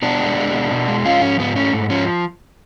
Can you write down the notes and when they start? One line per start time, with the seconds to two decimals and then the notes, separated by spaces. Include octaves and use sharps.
0.02 B2 B3 D4
0.20 G#3
0.37 G#3
0.54 B2
0.71 B2
0.88 G#3
1.05 G#2 C#4 F4
1.22 F3 C#4
1.39 G#2 B3
1.56 A3 C#4
1.73 G#2
1.90 F3 C#4